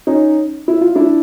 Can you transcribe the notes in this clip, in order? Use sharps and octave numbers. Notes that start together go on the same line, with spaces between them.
C#4 D#4
E4
F4
D4 E4